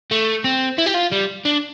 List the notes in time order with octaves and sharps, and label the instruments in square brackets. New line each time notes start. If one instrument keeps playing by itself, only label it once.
[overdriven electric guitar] A3
C4
E4
G4
F4
G3
D4